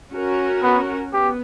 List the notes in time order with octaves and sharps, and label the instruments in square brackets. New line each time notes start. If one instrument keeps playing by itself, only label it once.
[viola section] C#4 F#4 A#4
[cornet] B3
[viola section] B3 [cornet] G4